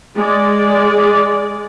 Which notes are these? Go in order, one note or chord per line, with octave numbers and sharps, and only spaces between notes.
G#3 D5